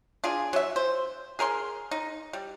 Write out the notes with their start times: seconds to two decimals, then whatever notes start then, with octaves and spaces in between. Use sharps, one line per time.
0.24 D4 F4 G#4
0.53 F#3 E5
0.76 C5
1.39 G#4 A#4 G5 C6
1.91 D#4
2.33 G3